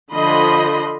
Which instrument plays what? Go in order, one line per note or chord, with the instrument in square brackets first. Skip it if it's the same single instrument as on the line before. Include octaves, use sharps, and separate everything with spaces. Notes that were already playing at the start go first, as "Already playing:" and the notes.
[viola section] D3 F3 D#5 B5 C6